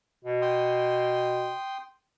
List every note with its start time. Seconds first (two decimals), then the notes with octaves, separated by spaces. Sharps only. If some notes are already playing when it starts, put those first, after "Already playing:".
0.24 B2
0.42 G5 C6 D#6